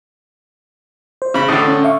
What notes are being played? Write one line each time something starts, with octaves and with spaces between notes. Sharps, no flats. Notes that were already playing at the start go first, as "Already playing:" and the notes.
C5
C#3 B5
A2 D3 D#6 A6
C#4
E5 F5 C#6